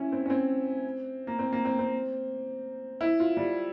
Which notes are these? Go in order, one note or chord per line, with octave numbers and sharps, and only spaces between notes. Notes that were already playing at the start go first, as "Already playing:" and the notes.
Already playing: C#4 E4
C4
C#4
C4
A#3
C4
A#3
C4
C4
E4
F4
G3